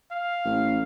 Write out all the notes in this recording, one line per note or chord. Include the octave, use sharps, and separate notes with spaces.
F5
A1